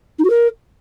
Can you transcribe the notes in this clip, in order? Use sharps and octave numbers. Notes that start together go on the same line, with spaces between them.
D#4
F#4
A#4